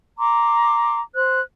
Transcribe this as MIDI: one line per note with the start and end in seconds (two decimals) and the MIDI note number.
0.17 1.00 82
0.17 1.00 84
0.17 1.00 86
1.15 1.40 72
1.15 1.40 90